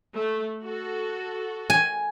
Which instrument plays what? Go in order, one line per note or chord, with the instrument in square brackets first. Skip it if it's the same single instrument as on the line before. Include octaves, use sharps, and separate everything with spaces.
[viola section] A3
F#4 A4
[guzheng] G#5